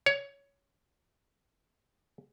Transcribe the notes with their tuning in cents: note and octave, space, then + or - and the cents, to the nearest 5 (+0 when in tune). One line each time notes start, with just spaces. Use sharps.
C#5 +15